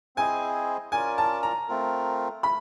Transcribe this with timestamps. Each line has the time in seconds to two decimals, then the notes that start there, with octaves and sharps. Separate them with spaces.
0.16 C4 E4 G#4 C5 D#5 G#5
0.92 C#4 F4 A#4 D5 G#5
1.18 A5
1.43 A#5
1.68 A3 C4 F4 A#4
2.43 A3 B5